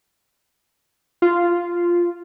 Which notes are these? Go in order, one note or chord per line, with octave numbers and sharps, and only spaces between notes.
F4